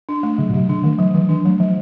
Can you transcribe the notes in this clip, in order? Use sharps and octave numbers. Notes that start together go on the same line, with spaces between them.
D4
A3
C#3 F#3
B2
C3 F#3
C#3 D4
D#3 A3
F3 F#3
E3 F#3
E3 D4
F#3 A3
F3 F#3